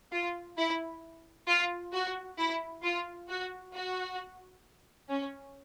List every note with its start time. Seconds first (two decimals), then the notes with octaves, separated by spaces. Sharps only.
0.12 F4
0.57 E4
1.48 F4
1.93 F#4
2.38 E4
2.83 F4
3.29 F#4
3.74 F#4
5.09 C#4